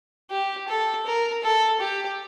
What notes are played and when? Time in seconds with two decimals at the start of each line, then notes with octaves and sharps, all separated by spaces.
0.30 G4
0.68 A4
1.06 A#4
1.43 A4
1.80 G4